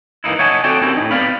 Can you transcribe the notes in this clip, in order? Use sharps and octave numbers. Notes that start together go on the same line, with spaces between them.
G#2 E3 A#3 D#4 E4
C#5 D#5 E5 F#5 G#5 A5
C4 F#4 A4 D5 G5 A5
C4 C#4 E4 G4 A#4
A2 D#4
B3 C4 D5 F5 B5